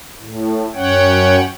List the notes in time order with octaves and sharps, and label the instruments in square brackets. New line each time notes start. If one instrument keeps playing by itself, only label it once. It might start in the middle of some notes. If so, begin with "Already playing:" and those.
[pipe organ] A2
F#2 C#4 C#5 F#5 G5